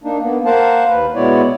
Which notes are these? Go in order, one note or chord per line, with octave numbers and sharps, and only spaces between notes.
A#3 D4 D#4
A#3 B3
A#3 A#4 C5 F5 F#5 A5
D#2 B4
B2 G#3 B3 E4 C#5 D5